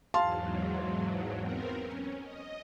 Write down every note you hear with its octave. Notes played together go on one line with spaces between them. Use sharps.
E2 G#2 F#3 F5 A5 C6
B3 C4 A#4
C#4
D#5